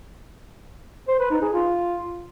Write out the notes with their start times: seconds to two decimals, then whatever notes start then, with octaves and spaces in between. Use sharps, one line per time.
1.08 C5
1.19 B4
1.31 D#4
1.42 G#4
1.53 F4